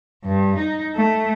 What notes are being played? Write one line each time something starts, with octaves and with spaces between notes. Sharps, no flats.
G2
D#4
A3